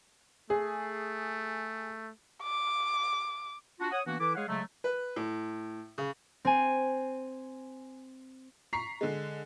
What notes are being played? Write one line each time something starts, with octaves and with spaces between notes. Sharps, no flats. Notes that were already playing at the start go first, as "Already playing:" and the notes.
A3 G#4
D6
D4 F4 F#4
C#5 F#5 D#6
E3 A#3 B3 D4 F#4
E3 E4 A4 B4 D6
G#3 G#4 C#5 F5 F#5
C#3 F#3 G#3 A3
B4
A2
C#3
C4 G#5
A#5 C#6 B6 C7
D3 G#3